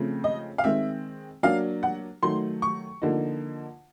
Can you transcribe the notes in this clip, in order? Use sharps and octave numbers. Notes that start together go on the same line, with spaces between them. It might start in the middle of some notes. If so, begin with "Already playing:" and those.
Already playing: C#3 F3 A3 C4
D#5
F5
D#3 G#3 C4 E5
F#3 A#3 D4 F5
F#5
D#3 F#3 A3 C6
C#6
D3 F3 A#3 D#4